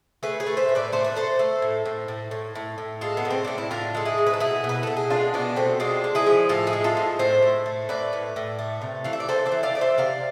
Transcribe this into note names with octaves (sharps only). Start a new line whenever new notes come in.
A3 G#4 B4
G#4 B4
A3
C5 E5
A2
B4 D5
A3 C5
B4
A3 A4 C5
A3
A2
A2
A2
A2
A2
A2
G#3 F4 A4
B3
A2
C4
A2 D4
E4
A2 D4 F4
G#3 A4
E4 G#4
A2
B4
A4
B2 E4 G#4
B2
B4
B2 A4
G#4
G#3 D4 F4
B2 B3 D4
B2 A3 C4
G#3 D4 F4
G#3
E4 G#4
F3
A2 F4 A4
E4 G#4
G#3
F4 A4
A2
A2 C5 E5
A2
A3
A2 B4 D5
A2
A2
A3
C3
E3 F5
E5
D5
E3 A4 C5
C5 E5
E3
D5 F5
A3 D5
C5 E5
C3 D5 F5